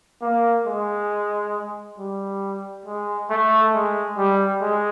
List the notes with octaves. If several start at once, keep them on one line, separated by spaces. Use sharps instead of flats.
A#3
G#3
G3
G#3
A3
G#3
G3
G#3